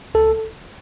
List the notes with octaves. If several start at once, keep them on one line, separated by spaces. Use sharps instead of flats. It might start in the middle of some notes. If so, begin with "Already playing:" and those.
C#2 A4